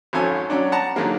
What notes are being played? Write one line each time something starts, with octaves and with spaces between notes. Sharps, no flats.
G#1 F2 C#4 A4 G#5
F#3 C#4 D4
F#5 A5 A#5
D3 D#3 F#3 G#3 A#3